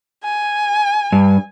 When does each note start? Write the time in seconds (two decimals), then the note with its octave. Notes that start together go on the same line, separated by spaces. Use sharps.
0.24 G#5
1.12 G2